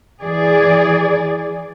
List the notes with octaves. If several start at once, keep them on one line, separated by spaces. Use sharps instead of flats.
E3 G#4 D5